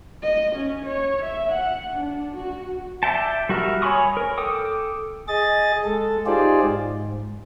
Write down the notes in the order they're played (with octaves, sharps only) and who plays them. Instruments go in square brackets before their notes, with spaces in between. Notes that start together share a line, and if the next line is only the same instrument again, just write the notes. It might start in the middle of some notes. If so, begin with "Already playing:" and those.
[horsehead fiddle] D#5
C#4
C#5
E5
F#5
D4
F#4
[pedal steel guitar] D5 E5 G5 A5
G3 F#4 A#4 E5 F6
C#5 G#5 B5 C#6 D#6
A#4
A4 G5 D6 D#6
[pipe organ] G#4 D#5 A6
G#3 A4
D#4 F4 G4 G#4 C5 D5
G#2